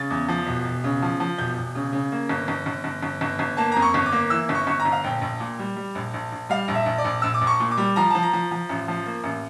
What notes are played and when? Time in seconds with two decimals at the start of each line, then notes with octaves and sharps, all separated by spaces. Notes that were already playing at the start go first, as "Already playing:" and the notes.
Already playing: C#3 A6
0.10 E2
0.28 F3
0.47 E1
0.65 E1
0.84 C#3
1.02 F3
1.20 F3
1.38 E1 G6
1.57 E1
1.75 C#3
1.93 C#3
2.12 A#3
2.29 G1
2.48 G1
2.66 G1
2.84 G1
3.03 G1
3.21 G1
3.39 G1
3.57 A#3 A5
3.72 F2 A#5
3.82 C#6
3.94 G1
4.06 D6
4.12 A#3
4.30 E3 E6
4.49 G1
4.55 C#6
4.67 G1 C#6
4.80 A#5
4.85 G1
4.92 F5
5.04 A#1 G5
5.22 A#1
5.40 A#2
5.59 G3
5.76 G3
5.95 A#1
6.14 A#1
6.32 A#1
6.49 G3 F5
6.68 A#1
6.75 E5
6.86 A#1
6.98 D5
7.04 A#1
7.22 A#1 E6
7.34 D6
7.41 A#1
7.47 C#6
7.60 A#2
7.71 D6
7.77 G3
7.96 F3 A#5
8.10 F3 A5
8.23 A#5
8.33 F3
8.51 F3
8.69 A1
8.88 F3
9.06 A#3
9.24 A1